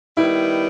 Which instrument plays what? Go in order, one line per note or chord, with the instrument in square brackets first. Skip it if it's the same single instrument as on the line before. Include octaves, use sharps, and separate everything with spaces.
[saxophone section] D#3 G3 B3 [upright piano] E4